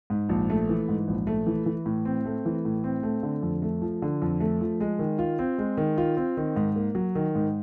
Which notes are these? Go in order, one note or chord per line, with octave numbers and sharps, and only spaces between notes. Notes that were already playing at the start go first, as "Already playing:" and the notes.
G#2
A#1
A3
E3
G#2
A#1
A3
E3
E3
A2
C4
A3
E3
A2
C4
A3
D3
F2
A3
F3
D3
F2
A3
F3
G#3
D#3
F4
C4
G#3
D#3
F4
C4
D#3
G#2
A#3
F#3
D#3
G#2